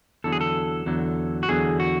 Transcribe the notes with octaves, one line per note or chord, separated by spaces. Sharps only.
E2 D3 F#3 A4
G#4
A4
E2 D3 F#3
F#4
E2 D3 F#3 G#4
F#4